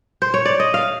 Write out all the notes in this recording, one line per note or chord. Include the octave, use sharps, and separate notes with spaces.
C5
C#5
D5
D#5
F5